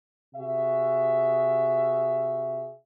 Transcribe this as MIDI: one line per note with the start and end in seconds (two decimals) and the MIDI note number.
0.34 2.72 48
0.34 2.72 66
0.34 2.72 68
0.34 2.72 76